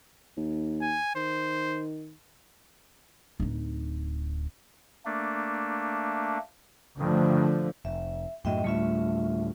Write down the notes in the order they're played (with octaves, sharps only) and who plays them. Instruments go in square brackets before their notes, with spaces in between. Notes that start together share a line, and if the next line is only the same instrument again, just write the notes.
[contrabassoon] D#2
[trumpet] G#5
[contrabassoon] D#3 [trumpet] C5
[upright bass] D1 D#4
[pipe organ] A3 A#3 D4
[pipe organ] G2 D#3 [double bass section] D3 F3 A3
[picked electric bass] F1 [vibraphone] E5
[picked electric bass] F#2 A2 F#3 [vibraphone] D#5 E5 G5
[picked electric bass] D2 A2 G3 [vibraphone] A3 F4 E5